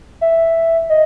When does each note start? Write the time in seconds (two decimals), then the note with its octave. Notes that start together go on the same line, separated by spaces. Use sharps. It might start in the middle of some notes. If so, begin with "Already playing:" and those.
0.21 E5
0.90 D#5